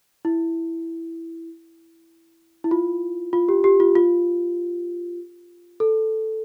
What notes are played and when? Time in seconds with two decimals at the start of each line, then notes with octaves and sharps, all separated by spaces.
0.25 E4
2.64 E4
2.71 F4
3.33 F4
3.49 G4
3.64 G4
3.80 F4
3.95 F4
5.80 A4